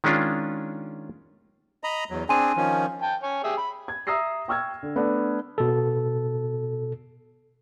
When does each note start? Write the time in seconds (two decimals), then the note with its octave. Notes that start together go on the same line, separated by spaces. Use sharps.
0.04 D#3 G#3 C#4 D4 F4
1.84 D#5 A#5 B5
2.10 E2 F#3
2.29 C4 D4 G#4 G#5 C6 D#7
2.57 D#3 F3 C#4
3.02 G5 A5
3.23 C#5 G#5
3.44 G4 G#4 E5
3.57 B5
3.88 G#6
4.07 E5 A#5 D#6 E6 A#6 C7
4.48 G5 C#6 E6 F6 G#6
4.83 D3
4.95 A3 B3 D4 A4
5.58 B2 A4